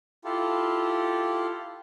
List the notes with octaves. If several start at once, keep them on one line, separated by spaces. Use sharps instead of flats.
E4 F4 G4 A4